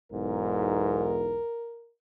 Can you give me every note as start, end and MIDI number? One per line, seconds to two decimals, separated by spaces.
0.12 1.41 35
0.12 1.41 40
0.12 1.41 44
0.12 1.91 70